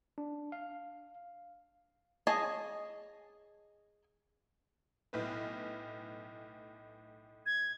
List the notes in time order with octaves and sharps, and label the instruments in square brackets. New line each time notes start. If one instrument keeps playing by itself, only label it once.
[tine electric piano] D4
F5
[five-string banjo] G#4 C#5 D#5 G#5 A5
[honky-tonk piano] B1 A2 B4
[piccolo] G#6